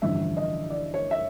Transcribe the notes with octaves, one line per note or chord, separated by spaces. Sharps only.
A1 G2 D3 F3 E5
D#5
D5
C#5
E5